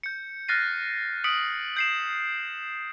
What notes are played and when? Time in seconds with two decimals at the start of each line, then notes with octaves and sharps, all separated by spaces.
0.03 G6 C#7
0.48 F6 F#6 A6 A#6 C7 D#7
1.24 D#6 B6 C#7 D7 F#7
1.76 G6 C7 E7